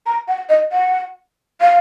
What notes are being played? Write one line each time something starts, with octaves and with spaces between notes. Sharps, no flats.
A#5
F#5
D#5
F#5
F5